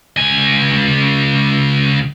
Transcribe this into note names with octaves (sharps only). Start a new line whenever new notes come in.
C#2 G#5